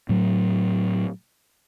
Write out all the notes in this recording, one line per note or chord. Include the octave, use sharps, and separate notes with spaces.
A2 F#3